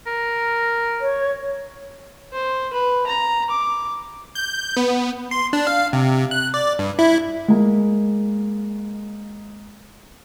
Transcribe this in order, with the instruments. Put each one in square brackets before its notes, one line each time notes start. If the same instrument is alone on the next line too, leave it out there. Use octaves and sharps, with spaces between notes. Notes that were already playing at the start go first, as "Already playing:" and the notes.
[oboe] A#4
[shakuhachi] C#5
[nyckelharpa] C5
B4
A#5
D6
[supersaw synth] G6
B3
[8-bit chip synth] C6
D4
F5
C3
F#6
D5
G2
E4
[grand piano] G#3 A#3